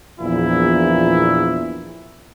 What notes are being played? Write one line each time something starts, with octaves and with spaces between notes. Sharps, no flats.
A#1 E2 A#2 E4